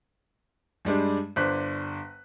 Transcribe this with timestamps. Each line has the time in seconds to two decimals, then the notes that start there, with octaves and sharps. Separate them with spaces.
0.85 G2 G3 G#3 D4
1.36 G1 D4 C5 F#6 B6